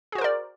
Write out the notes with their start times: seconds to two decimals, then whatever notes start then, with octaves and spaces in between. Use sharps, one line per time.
0.12 G#4
0.15 F#4
0.18 C5
0.21 A#4
0.24 D5